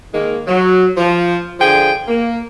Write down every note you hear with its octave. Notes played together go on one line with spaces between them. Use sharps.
D#3 G#3 A#3
F#3
F3
D3 F3 G#4 G5
A#3